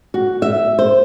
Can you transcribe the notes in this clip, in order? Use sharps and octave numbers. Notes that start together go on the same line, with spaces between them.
F#4
E5
C5